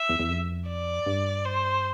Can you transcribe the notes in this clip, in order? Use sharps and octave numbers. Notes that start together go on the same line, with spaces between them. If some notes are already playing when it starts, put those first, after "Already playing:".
Already playing: E5
E2
E2
F2
D5
G2
C5